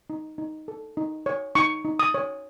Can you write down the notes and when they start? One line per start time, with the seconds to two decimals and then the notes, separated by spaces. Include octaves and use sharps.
0.10 D#4
0.38 D#4
0.68 A4
0.97 D#4
1.26 C#5
1.55 D#4 C#6
1.85 D#4
1.99 D#6
2.14 C#5